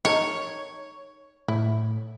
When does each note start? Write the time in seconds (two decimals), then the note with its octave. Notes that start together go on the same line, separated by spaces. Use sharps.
0.05 D#4 A4 A#4 C#5
1.48 A2 E4